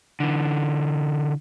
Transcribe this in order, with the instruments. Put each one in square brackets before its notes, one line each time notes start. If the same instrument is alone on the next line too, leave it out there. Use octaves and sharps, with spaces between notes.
[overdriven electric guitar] D3 E3